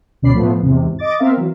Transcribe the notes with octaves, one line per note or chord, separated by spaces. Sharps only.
D2 B2 C#4 D5 B5 C7
A2 F3 A3 B3
E2 G#2 C3
D#5 D6 A6
B3 C4 A#4 E5 F5
E3 F#3